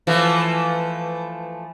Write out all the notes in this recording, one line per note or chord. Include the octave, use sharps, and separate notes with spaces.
E3 F3 A3